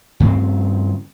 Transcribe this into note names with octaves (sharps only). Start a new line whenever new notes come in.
G2 C#3 C4